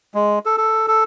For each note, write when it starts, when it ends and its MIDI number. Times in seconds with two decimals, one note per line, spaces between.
0.14 0.39 56
0.46 0.56 69
0.58 0.87 69
0.88 1.04 69